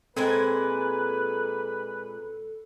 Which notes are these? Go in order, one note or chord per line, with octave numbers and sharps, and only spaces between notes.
A#2 G#3 C4 A4 B4 G#5